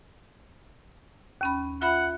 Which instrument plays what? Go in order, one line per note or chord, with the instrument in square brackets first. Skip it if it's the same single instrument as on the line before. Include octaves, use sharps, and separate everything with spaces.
[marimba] D#2 C#4 B5
[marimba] F4 E5 B5 [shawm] F#5